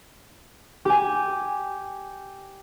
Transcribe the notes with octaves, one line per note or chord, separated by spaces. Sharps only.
G4 G#5